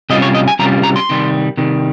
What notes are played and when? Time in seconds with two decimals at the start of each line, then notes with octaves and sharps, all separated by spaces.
0.10 C3 G3 C#4 F4 D#5
0.22 C#5
0.35 D#5
0.48 G#5
0.59 C3 G3 C#4 F4 A#5
0.83 A#5
0.96 C6
1.09 C3 D#3 G3
1.57 C3 D#3 G3